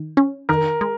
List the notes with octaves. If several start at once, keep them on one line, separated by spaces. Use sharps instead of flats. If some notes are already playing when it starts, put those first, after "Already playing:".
Already playing: D#3
C#4
D#3 A#4
G#3